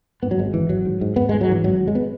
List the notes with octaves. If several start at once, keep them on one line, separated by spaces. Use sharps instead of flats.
G#2 B3
F#3
G#1 G#3
G#1 E3
G#1 F#3
G#2
G#2
G#2 B3
G#2 G#3
F#3
G#2 E3
G#1 F#3
G#1
G#3
B3